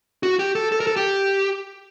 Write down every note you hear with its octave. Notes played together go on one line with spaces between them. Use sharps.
F#4
G4
A4
A4
A#4
A4
G4